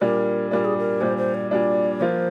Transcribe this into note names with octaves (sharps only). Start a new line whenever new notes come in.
A#2 G3 D4 A#4
A#2 G3 D4 A#4
G#4
A#4
A#2 G3 D4 C5
C5
D5
A#2 G3 D4 D5
F3 A#3 F4 C5